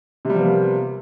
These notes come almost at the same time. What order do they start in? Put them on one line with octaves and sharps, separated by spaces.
C3 G3 F3 B3 A#3